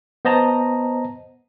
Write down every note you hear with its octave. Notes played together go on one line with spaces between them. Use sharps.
B3 C5 D#5 A5 A#5